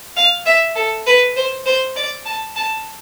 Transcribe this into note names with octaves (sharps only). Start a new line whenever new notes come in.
F5
E5
A4
B4
C5
C5
D5
A5
A5